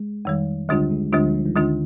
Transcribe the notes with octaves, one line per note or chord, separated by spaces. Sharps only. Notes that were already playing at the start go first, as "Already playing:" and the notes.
Already playing: G#3
F2 D#3 G3
D2 D3 G3 G#3 D4 F4
G#3
D2 D3 G3 G#3 D4 F4
F3
F3
D#3
D2 D3 D#3 G#3 D4 F4